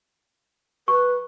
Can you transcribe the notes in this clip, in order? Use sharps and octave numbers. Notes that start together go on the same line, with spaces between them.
B4 C#6